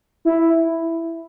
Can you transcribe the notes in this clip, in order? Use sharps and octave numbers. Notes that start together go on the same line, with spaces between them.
E4